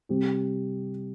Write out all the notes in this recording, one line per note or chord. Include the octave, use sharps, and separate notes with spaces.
C3 G3 C4 G4